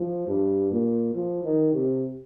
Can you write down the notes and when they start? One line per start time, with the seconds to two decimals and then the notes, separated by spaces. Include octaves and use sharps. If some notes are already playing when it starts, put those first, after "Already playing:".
Already playing: F3
0.28 G2
0.71 A#2
1.14 F3
1.43 D#3
1.73 C3